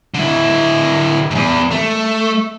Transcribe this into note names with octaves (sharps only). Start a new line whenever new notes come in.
D3 E4
E2 G#2
A3